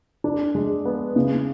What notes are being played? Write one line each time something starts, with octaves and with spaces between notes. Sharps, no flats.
D4
G#3
B3
C#3